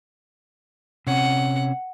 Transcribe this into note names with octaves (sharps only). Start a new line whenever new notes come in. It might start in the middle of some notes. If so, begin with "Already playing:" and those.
C3 C#4 F#5